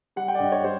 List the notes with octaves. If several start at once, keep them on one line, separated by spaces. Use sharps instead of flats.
G3 F#5
G5
D5
G2 D#5
C#5
G3 C5